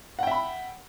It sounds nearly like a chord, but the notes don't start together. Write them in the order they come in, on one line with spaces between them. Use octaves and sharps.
F#5 G5 E5 B5